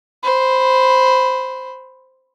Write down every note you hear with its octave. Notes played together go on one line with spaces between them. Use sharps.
C5 B5